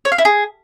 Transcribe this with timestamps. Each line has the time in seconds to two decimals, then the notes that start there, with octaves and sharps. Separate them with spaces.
0.05 C#5
0.12 F5
0.18 E4
0.25 G#4